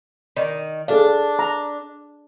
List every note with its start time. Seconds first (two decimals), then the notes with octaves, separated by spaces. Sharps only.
0.37 D#3 D5
0.88 D4 G#4 A4 F5
1.39 A#5